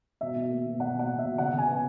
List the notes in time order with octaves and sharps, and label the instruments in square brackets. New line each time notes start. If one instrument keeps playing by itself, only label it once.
[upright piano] B2 E5
B2
A#3
B2
A#3 F#5
B2
F#5
B2
E5
B2
C#3 F#5
C#3 G#5
B3